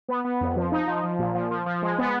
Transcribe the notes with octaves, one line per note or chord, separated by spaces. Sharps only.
B3
B3
F2
F3
D#4
F3
F3
A#2
F3
F3
F3
G#3
B3